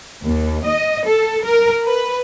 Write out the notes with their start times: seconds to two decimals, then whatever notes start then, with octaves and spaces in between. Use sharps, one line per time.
0.23 D#2
0.64 D#5
1.07 A4
1.44 A#4
1.84 B4